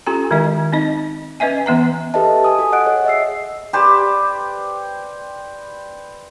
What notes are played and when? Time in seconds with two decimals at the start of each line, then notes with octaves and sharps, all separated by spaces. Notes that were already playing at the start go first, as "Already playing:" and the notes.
0.06 C#4 F4 G4 A4 A#5
0.31 D#3 G#3 E4 D#5
0.72 C4 D#4 D#5
1.40 C#4 B4 D#5 E5 G#5
1.66 E3 B3 E5 A#5
2.14 G4 A4 B4 D#5 E5 A5
2.44 G#5 D#6
2.59 F#4 A4
2.72 D#5 F#5 F#6 D7
2.85 G#4 C#5
3.05 D#5 E5 E6 C7
3.73 G4 B4 C5 D5